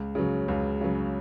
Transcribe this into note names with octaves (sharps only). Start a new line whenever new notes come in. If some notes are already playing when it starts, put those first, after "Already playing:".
Already playing: C#2
C#3 F#3
C#2
C#3 F#3